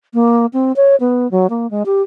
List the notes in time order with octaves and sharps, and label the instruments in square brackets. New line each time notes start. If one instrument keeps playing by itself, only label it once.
[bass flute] A#3
C4
C#5
B3
F#3
A#3
G#3
G4